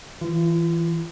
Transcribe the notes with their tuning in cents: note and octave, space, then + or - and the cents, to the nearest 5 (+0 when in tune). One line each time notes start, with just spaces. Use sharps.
E3 +0 F4 -40